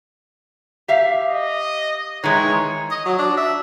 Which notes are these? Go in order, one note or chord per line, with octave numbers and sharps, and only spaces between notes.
G4 E5 F5
D#5
D#3 E3 G#3 C#5
D#5
F#3
D4
E5